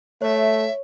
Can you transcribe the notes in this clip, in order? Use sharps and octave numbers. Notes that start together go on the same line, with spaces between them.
A3 C#5 E5